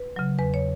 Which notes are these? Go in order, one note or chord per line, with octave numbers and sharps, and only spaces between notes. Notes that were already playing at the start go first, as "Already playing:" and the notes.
Already playing: B4
C#3 F#3
E2 B4
C#5